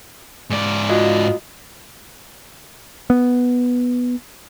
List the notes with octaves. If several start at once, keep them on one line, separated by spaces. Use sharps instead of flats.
G#2 D5
F4 F#4 D#5
B3